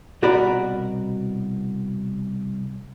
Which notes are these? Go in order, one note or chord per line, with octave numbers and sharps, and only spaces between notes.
C2 B2 F#4 A#4 D5 B5